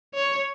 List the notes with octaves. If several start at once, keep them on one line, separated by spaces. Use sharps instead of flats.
C#5